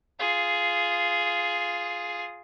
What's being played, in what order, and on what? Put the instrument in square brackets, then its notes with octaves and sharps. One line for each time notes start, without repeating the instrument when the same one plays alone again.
[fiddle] F4 G#4